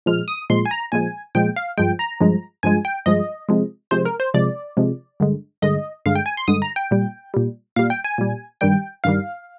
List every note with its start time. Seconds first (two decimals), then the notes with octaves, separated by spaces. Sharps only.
0.06 A#2 F3 G#3 F6
0.28 D#6
0.50 A#2 F3 G#3 C6
0.66 G#5
0.71 A#5
0.92 A#2 F3 G#3 G#5
1.35 A#2 F3 G#3 G5
1.56 F5
1.78 G2 F3 G#3 G5
1.99 A#5
2.21 G2 F3 G#3
2.63 G2 F3 G#3 G#5
2.85 G5
3.06 G2 F3 G#3 D#5
3.49 C3 F3 G#3
3.91 C3 F3 G#3 C5
4.05 A#4
4.20 C5
4.34 C3 F3 G#3 D5
4.77 C3 F3 G#3
5.20 G2 D3 G#3
5.62 G2 D3 G#3 D#5
6.06 G2 D3 G#3 F5
6.15 G5
6.26 G#5
6.37 C6
6.48 G2 D3 G#3 D#6
6.62 A#5
6.76 G5
6.91 A#2 G3
7.34 A#2 G3
7.76 A#2 G3 F5
7.90 G5
8.04 G#5
8.18 A#2 G3
8.61 G2 D#3 G3 G5
9.04 G2 D#3 G3 F5